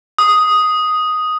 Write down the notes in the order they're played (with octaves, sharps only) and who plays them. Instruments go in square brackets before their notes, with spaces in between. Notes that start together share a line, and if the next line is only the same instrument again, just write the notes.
[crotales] D#6